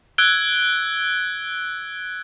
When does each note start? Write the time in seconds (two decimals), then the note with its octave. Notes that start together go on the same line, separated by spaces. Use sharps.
0.18 E6 F#6 G#6 D7 G7